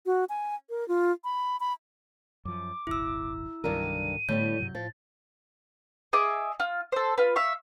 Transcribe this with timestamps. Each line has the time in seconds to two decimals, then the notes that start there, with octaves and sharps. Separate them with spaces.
0.06 F#4
0.29 G#5
0.70 A#4
0.88 F4
1.24 B5
1.60 B5
2.45 F#2 F3 D6
2.87 D#1 G#1 E4 E6
3.64 C2 G2 D3 D#3 F#3 A#4 D#7
4.29 A2 D3 G3 A3 B3 G6
4.60 G2 C3 F#3
4.75 A2 F3 A6
6.13 G#4 D#5 E5 D6
6.60 F4
6.92 A4 C5
7.18 F4 B4
7.36 E5 F5 C#6